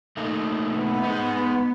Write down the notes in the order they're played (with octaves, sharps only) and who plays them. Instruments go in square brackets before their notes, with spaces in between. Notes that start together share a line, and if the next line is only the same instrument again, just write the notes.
[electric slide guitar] A3 A#3 D#4
[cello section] B3
[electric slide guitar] G#3 D#4